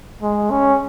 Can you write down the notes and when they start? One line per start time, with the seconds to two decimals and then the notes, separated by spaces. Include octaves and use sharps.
0.22 G#3
0.51 C#4